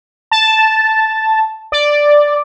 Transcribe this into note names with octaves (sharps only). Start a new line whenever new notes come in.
A5
D5